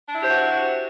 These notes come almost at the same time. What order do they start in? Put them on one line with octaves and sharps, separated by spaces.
D4 E4 G4 C5 F#4